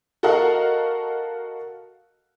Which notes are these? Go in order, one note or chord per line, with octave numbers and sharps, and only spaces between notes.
F#4 A4 A#4 D#5 F5 F#5